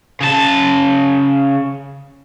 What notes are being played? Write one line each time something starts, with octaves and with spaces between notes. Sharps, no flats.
C#3 A5